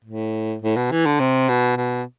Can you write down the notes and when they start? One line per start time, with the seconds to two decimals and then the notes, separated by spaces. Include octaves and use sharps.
0.05 A2
0.62 A2
0.76 B2
0.91 E3
1.06 D3
1.20 C3
1.49 B2
1.77 B2